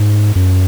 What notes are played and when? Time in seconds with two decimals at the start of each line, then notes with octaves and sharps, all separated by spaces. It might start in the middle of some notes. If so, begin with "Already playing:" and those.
Already playing: G#2
0.36 F#2